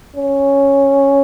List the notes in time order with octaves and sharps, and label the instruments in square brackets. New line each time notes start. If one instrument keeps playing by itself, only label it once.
[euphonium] C#4